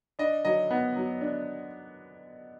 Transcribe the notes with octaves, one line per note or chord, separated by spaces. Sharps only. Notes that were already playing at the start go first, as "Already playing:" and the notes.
D4 D#5
F#3 D#5
B3
F#3
D4